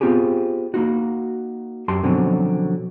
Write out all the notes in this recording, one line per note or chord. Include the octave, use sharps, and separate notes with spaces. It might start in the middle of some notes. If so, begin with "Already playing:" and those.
B3 C4 F4 G4 G#4
A#3 D#4 F#4
F#2 G4 A5 C6
B2 D3 F3 F#3 C4 C#4